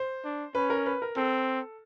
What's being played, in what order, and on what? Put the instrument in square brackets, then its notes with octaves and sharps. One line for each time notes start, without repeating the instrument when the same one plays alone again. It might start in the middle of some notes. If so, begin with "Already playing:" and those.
Already playing: [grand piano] C5
[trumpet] D4
[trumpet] C#4 [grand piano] B4
[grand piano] A#4
B4
A#4
[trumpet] C4 [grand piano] A4